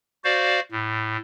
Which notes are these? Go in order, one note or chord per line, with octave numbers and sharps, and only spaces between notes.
F#4 C5 D5 F5
A2